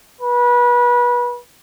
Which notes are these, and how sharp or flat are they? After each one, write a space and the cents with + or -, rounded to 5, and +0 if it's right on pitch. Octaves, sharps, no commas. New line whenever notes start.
B4 -25